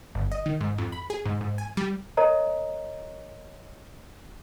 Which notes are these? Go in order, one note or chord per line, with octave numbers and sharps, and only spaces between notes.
G1
D#5
D#3
G#2
F2
B5
G#4
G#2
G#2
G#5
G3
A#4 C#5 D#5 A#5